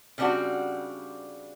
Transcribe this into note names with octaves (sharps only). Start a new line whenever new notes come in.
C#3 G3 C4 D4 F#4